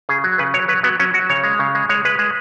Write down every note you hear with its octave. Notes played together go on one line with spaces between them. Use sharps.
C#3 G#4
F#3
C#3 B4
F#3 C#5
F#3 B4
F#3 B3
F#3 C#4
F#3 F#4
C#3 C#5
G#3
C#3
G#3
G#3 C#5
G#3 B4
G#3